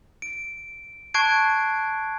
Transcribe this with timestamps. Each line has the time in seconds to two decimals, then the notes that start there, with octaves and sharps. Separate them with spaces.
0.22 D7
1.14 A5 C#6 F#6 G#6 C7 D7